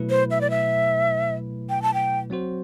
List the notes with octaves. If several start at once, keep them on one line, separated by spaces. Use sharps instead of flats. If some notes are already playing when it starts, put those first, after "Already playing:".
Already playing: B2 F#3 A3 E4 B4
C5
E5
D5
E5
G5
A5
G5
F#3 C4 F#4 C5